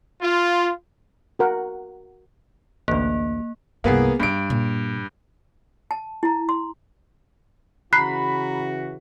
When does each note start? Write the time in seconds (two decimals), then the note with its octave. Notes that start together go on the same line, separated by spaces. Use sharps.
0.22 F4
1.39 F#4 A#4 F#5
2.88 A1 D2 A#3
3.84 C2 G2 A#3 B3 G#4
4.20 G2 D4 D7
4.50 A#2
5.91 A5
6.23 E4 A#5
6.49 C6
7.93 C#3 E3 F#4 A#5 B5 F#6 B6 C7